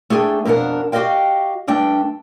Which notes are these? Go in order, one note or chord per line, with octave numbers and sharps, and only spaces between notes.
A3 D4 G#4 G5
F2 B2 D4 A#4 F#5
F#4 G4 D5 D#5 F5 G5
G2 A3 D4 G5